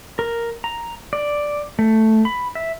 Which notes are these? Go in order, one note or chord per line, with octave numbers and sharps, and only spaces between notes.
A#4
A#5
D5
A3
B5
E5